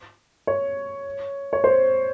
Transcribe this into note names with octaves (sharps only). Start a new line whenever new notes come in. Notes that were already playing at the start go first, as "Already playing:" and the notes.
C#5
C#5
C5